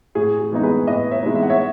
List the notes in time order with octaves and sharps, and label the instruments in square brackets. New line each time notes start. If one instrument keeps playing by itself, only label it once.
[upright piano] A2 G#4
G#4
E3 G#3 B3 D#4
G#4 B4
A2 B4 D#5
C#5 E5
E3 G#3 B3 D#4
E5
F#5
C#5 E5